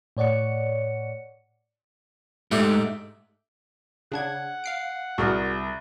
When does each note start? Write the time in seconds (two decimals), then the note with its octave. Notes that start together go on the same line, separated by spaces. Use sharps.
0.17 A2 C#5 D5 F#5 C#7
2.51 G#2 A3 D4 G4
4.12 C#3 D4 F#5 G#6
4.64 F5 C7 D7
5.18 C2 F#4 G#4 A#4